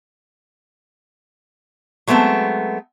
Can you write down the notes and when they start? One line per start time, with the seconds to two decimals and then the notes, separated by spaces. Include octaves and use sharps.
2.07 F#3 G#3 A3 B3 C4